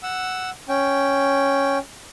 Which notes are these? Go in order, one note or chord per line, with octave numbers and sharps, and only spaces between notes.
F#5 E6
C#4 G5